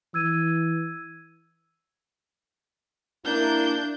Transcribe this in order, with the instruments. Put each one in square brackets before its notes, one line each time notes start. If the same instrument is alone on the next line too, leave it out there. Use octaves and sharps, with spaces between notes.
[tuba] E3 [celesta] E6 G#6 D#7
[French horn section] A#3 E4 [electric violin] D4 G6